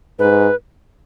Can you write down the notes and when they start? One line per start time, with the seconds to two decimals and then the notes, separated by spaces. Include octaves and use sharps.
0.19 G#2 B4